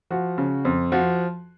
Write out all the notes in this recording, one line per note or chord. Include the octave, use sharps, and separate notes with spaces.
F3 F#4
C#3
F2
F3 F#4